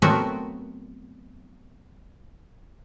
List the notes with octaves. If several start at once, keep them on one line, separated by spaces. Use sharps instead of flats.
F#3 A3 B3 C4 F#4 A#4